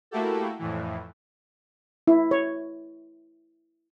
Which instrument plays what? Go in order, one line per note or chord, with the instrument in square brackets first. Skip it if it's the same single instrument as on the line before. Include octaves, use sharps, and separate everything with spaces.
[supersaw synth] A3 A#3 E4 F#4 G4 A4
F2 A2 E3
[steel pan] E4
C#5